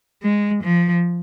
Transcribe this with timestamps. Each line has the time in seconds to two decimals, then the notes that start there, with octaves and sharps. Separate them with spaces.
0.22 G#3
0.63 F3